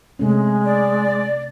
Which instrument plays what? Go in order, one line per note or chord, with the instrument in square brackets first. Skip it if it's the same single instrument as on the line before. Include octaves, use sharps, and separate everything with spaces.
[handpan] C3 A3 C#4 [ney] G#3
[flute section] D5